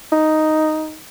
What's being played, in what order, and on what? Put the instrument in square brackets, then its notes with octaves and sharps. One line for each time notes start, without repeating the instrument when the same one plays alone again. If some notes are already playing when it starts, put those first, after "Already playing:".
[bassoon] D#4